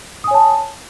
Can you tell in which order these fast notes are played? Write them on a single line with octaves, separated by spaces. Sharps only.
D#6 G#5 C#5 A5